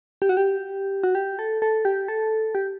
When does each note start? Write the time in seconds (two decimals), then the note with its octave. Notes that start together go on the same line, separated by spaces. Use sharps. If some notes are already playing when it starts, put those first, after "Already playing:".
0.22 G4
0.29 F#4
0.37 G4
1.03 F#4
1.15 G4
1.39 A4
1.62 A4
1.85 G4
2.08 A4
2.55 G4